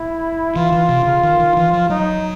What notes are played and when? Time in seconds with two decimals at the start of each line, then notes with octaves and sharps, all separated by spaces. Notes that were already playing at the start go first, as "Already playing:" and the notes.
Already playing: E4
0.56 E3 F4
0.72 E3
0.89 C3
1.05 C#3
1.23 D#3
1.39 D#3
1.57 E3
1.73 F3
1.90 F#3 D#4